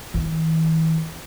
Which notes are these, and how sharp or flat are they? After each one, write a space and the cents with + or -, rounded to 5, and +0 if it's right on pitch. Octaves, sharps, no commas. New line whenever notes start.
E3 -40